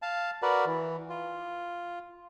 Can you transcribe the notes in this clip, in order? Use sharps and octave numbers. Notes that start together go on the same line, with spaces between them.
F5 A5
F#4 A#4 B4 D5
E3
F4